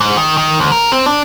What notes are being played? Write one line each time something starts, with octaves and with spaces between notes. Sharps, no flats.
G#2
D#3
D#3
D2
A#4
C4
D4